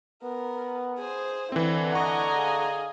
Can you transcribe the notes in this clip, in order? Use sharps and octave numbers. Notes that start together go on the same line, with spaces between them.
B3 A#4
G#4 C5
D3 E3 C4 E4
D#5 F#5 G#5 A#5 C#6
G#4 F5